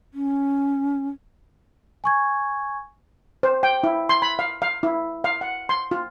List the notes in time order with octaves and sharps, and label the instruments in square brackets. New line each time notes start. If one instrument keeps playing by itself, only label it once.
[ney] C#4
[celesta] G#5 C#6 G#6
[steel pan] C5
G5
E4
C6
B5
F5
F5
E4
F5
F#5
C6
F4